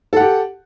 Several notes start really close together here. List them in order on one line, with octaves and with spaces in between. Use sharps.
A4 F#5 G4